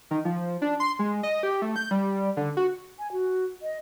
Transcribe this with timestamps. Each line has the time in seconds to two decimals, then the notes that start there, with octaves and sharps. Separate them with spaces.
0.11 D#3
0.25 F3
0.62 D4
0.80 C6
0.99 G#3
1.23 D#5
1.43 G4
1.62 A3
1.76 G6
1.91 G3
2.37 D3
2.57 F#4
2.99 G#5
3.12 F#4
3.62 D#5